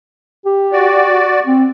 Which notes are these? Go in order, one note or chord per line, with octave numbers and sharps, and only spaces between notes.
G4
F#4 D5
C4